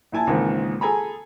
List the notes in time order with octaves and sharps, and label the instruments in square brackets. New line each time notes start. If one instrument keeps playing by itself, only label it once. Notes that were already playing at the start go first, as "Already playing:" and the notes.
[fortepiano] A#1 E4 G#5 A5
C#2 G#2 D#3 E3 A#3 C4
G#4 A4 G#5 A#5 B5